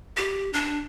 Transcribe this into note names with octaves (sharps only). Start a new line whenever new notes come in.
G4
D4